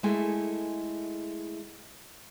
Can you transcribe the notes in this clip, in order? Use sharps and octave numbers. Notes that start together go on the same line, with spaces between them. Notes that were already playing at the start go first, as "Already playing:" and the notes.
G#3 A3 E4 G#4 A4 G#5